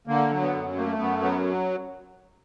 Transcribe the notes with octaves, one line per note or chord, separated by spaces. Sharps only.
D3 A#3
F#3
B3
F#2
A3 A#3
F#2 B3
F#3 B3